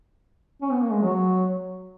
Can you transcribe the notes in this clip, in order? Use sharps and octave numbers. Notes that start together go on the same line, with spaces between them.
C#4
B3
A#3
G#3
F#3